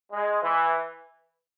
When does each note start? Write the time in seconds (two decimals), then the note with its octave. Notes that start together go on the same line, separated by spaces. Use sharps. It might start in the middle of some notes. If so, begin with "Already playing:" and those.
0.12 G#3
0.42 E3